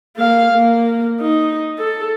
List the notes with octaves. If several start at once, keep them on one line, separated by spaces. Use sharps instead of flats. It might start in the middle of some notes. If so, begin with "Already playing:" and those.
A#3 F5
A#3
D#4
A4